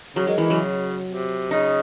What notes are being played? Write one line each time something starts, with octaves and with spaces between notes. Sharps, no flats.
C#3 F#3
D#3 G#3
D#3 E3
C#3 F#3
C3
C#3 D#4